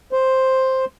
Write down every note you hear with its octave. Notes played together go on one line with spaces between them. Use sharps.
C5